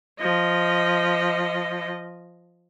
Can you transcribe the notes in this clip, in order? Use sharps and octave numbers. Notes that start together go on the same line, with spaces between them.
F3 D#5